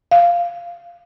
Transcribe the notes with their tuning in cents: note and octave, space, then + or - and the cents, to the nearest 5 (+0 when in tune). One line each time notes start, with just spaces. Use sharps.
F5 -5